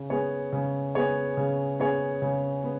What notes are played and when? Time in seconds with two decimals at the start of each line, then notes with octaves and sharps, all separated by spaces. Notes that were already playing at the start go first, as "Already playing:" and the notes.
Already playing: C#3
0.10 B3 G#4 C#5
0.52 C#3
0.95 B3 G#4 C#5
1.37 C#3
1.80 B3 G#4 C#5
2.22 C#3
2.64 B3